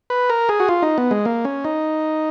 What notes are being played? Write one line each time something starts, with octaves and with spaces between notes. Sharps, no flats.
B4
A#4
G#4
F#4
F4
D#4
B3
G#3
A#3
C#4
D#4